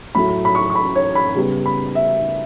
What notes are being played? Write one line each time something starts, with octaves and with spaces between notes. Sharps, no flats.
A2 F#3 A3 B5
B5
C#6
C#6
B5
C#5
B5
C#3 G3 B3
B5
E5